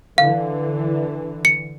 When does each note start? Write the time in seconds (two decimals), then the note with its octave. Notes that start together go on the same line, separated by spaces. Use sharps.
0.18 D3 E3 F5
1.45 C#7